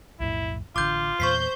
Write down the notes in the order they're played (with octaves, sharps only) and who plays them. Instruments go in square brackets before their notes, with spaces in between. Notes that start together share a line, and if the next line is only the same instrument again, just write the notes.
[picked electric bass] B1 F2 A2 [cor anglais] E4
[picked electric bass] A1 D3 [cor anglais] F4 [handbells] D6 G6
[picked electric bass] E2 A#2 [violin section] C5 G6 [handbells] C#6 B6 C7